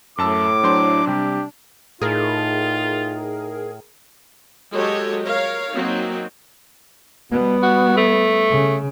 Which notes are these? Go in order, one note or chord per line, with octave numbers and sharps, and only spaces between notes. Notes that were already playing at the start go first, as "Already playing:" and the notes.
F#2 A2 A5 D6 E6
F#3 D4 C5 C6
C3 G3 G4
A2 D#4 F4 G#4 A#4
F#3 G#3 G4 A4 C#5 D#5
A#4 C#5 F5
F#3 A#3 C4 D#4
B2 G3 B3
F#4
A3
C#3